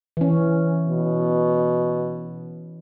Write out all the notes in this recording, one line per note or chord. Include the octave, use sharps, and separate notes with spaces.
E3 C#4
B2